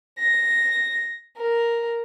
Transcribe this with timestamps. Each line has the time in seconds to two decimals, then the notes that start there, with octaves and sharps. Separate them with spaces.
0.19 A#6
1.37 A#4